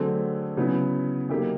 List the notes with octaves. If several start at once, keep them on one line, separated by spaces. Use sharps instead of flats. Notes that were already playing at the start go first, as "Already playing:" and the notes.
Already playing: D3 F#3 A3 C4 G#4
C#3 F#3 B3 E4
C3 D#3 F#3 A#3 G4